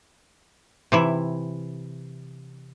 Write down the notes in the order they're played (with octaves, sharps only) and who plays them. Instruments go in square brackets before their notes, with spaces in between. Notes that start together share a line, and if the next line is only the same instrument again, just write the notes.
[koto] C3 E3 E4